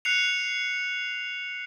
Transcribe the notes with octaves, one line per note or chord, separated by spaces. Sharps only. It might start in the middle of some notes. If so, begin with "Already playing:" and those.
F#6 C7 C#7 F7